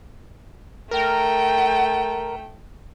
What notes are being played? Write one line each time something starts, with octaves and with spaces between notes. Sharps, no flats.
A3 A#4 G5